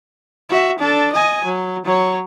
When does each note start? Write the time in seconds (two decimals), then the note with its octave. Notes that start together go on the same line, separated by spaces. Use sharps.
0.49 F#4 E5
0.79 D4 A4
1.12 D#5 G#5
1.45 F#3
1.85 F#3 C#5